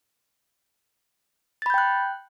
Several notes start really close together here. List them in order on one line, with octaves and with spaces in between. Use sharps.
A6 B5 G6 G5 F#6